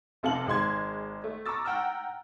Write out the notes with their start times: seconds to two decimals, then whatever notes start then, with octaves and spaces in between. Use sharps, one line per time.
0.23 F1 C3 A4 F5 A5 F#7
0.47 G#1 G#3 C6 G#6
1.24 A3
1.46 A#5 C#6 D6 E6 A6
1.64 F#5 G5 A#5 E6 F6